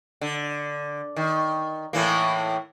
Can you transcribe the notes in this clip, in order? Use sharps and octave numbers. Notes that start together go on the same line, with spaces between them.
D3
D#3
A2 E3 A#3